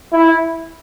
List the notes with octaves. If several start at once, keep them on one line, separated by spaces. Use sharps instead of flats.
E4